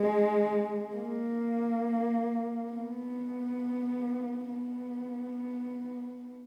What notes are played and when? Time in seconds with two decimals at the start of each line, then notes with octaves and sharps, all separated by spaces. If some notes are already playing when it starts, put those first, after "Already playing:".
Already playing: G#3
0.95 A#3
2.72 B3
4.49 B3